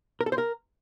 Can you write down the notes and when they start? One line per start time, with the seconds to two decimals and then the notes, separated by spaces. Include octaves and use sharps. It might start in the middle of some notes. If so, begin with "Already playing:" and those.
0.21 A#4
0.26 A4
0.32 C5
0.38 A#4